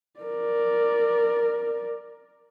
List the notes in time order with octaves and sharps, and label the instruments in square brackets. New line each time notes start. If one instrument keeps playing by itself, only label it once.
[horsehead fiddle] A#4 D5